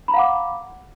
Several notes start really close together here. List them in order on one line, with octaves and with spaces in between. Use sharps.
B5 A#5 F5 F#5 D6